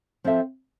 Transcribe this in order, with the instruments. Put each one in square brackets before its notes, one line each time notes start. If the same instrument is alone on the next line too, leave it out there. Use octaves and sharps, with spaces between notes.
[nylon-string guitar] F3 C4 F4 A4 E5